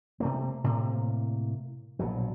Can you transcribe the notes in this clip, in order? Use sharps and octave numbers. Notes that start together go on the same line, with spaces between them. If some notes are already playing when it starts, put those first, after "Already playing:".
C3 A3 A#3
A2 C3 A#3
A#1 B2 F#3